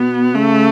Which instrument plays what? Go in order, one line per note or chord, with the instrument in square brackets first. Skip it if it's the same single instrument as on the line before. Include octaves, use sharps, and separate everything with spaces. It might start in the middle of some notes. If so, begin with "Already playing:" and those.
Already playing: [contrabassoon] B2 [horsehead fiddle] B3
[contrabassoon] C#3 [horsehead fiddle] A3